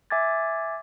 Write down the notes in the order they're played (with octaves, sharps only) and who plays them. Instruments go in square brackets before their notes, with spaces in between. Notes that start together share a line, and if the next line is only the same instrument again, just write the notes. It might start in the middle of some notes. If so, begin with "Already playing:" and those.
[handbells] E5 G#5 D6 G#6 A6